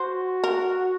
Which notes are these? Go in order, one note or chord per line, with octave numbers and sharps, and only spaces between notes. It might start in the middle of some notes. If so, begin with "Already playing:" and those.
Already playing: F#4 C5
A#4